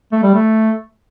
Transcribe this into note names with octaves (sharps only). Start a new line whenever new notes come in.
A3
G3
A3